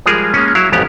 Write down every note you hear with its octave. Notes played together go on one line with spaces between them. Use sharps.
F3 G3 G#3 F4 G#4 A#4
G#3 A#3 C#4
F#3 E4 F5
A1 F2 G#2 B3 G4 A#5